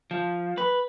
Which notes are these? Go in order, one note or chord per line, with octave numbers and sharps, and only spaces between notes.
F3
B4